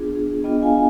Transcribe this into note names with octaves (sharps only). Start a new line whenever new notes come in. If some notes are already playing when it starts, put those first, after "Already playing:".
Already playing: B3 D4 F4 G#4
G#4
B3 D4 F4 D#5 G5
F5 G#5